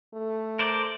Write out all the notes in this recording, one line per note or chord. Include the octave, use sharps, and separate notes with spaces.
A3
A#4 C5 D5